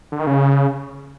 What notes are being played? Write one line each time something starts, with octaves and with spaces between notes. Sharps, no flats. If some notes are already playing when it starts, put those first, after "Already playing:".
D3
D#3
C#3